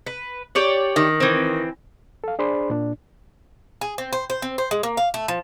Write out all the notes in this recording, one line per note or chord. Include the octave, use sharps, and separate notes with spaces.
B4
G4 C#5 D5
D#3
E3 C4
A4 F5
D4 G#4 C5 D5 B5 C6
A#2 D4
G#4
C4
C5
C5
C4
C5
G#3
A#3
F5
A3
F3